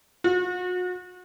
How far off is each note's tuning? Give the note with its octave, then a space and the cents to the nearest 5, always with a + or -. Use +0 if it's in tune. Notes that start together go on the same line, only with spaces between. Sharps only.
F#4 -40